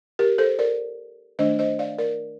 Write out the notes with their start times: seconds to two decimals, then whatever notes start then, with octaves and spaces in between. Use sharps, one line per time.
0.19 G4 A#4
0.38 A4 C5
0.59 A#4 D5
1.39 D#3 A3 D4 C5 D#5
1.59 C5 D#5
1.79 D5 F5
1.98 A#4 D5